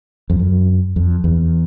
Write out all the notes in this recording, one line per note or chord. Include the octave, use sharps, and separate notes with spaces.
F2
F#2
F2
E2